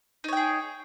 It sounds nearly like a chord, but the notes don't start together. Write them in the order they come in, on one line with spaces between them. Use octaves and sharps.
D#4 C#5 G5 G#4